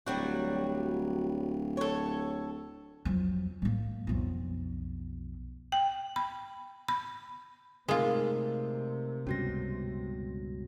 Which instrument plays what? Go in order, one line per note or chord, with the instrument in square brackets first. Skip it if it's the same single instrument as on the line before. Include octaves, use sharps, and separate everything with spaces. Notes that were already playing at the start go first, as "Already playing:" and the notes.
[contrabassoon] D1 [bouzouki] F#3 G3 F#4
[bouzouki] A4 C#5
[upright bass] F2 F#3
A2 A#3
B1 F2
[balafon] G5
B5
B5
[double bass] C3 [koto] G#3 F4 [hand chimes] A3 D#4 A#4
[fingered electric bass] C#2 G2 B2 [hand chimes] C#4 F#4 A#6